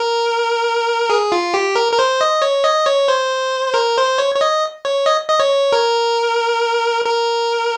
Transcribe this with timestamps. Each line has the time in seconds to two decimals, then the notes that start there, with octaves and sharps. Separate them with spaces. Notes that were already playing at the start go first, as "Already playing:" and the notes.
Already playing: A#4
1.10 G#4
1.32 F4
1.54 G4
1.75 A#4
1.93 A#4
1.99 C5
2.21 D#5
2.42 C#5
2.64 D#5
2.86 C#5
3.08 C5
3.74 A#4
3.97 C5
4.18 C#5
4.35 C#5
4.41 D#5
4.85 C#5
5.06 D#5
5.28 D#5
5.40 C#5
5.72 A#4
7.05 A#4